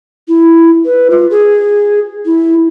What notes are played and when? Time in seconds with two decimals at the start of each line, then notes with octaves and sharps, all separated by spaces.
0.28 E4
0.85 B4
1.10 F4
1.30 G#4
2.25 E4